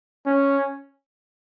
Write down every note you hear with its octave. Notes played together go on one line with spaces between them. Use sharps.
C#4